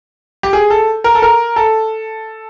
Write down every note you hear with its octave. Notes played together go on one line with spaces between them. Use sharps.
G4
G#4
A4
A#4
A4
A#4
A4